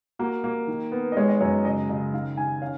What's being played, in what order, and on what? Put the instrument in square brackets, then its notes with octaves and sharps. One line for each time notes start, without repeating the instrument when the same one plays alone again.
[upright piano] A#3 F#4
A#3
D#3
B3
D#5
G#3 C#5
D#5
F#2 C#5
C#3 D#5
C#3 D#5
D#3 F5
D#3 G#5
C#4 F5